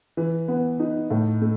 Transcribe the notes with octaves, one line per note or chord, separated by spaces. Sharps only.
E3
B3
D#4
A2
A3